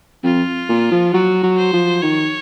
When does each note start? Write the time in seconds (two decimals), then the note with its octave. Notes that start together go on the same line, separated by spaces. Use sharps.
0.23 F2 F4
0.69 A#2
0.91 F3
1.13 F#3 F#4
1.43 F#3
1.58 C5
1.73 F3
2.02 D#3 C#5